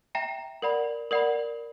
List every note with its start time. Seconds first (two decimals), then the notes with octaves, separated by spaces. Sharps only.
0.15 E5 G5 A#5
0.62 A#4 D5 F#5 B5
1.11 A#4 D5 F#5 B5